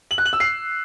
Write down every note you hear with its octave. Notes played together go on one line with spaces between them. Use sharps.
F#7
F#6
F#7
E6
C7